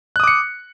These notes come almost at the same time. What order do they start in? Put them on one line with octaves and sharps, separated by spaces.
F#6 D#6 D6 C#7